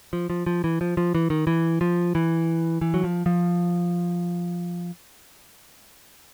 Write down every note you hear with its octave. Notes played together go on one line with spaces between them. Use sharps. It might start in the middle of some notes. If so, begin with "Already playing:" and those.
F3
F3
F3
E3
F3
F3
E3
D#3
E3
F3
E3
E3
F#3
F3
F3